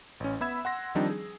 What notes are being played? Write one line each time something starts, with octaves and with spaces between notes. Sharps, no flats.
A1 C#4
B3 E5 B5 E6 G#6 E7
F#5 C6 A#6
D#3 F3 G3 C4 D4 D#4
G#4